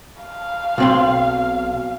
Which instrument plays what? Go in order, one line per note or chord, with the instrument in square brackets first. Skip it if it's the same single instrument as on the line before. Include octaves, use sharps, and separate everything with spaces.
[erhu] F5
[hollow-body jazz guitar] B1 C4 C6